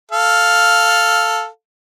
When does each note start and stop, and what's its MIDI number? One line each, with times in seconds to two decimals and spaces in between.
0.11 1.47 69
0.11 1.47 77